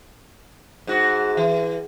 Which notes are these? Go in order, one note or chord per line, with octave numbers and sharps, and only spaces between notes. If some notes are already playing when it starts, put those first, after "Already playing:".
G#2 F#4
E3